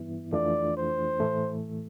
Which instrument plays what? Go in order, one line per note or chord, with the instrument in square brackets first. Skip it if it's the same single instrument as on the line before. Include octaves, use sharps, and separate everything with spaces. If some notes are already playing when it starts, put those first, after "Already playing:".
Already playing: [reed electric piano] G2 E3 B3 E4
[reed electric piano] F2 E3 A3 D4 F4 [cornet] D5
[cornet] C5
[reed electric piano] A2 E3 A3